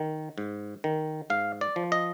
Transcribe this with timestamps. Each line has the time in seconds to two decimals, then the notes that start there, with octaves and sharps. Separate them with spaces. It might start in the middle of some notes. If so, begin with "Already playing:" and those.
Already playing: D#3
0.38 G#2
0.84 D#3
1.30 G#2 F5
1.61 D5
1.76 F3
1.92 D#5